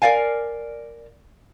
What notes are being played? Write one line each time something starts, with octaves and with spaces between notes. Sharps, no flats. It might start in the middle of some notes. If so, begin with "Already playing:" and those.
A#4 B4 D5 F5 G#5